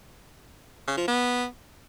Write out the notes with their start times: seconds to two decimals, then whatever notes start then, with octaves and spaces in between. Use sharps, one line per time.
0.88 C#3
0.98 F3
1.08 B3